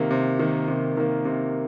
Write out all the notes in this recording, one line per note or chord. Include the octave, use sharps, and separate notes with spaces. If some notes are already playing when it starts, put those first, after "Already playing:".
Already playing: C3 D#3 A#3
C3
D#3 A#3
C3
D#3 A#3
C3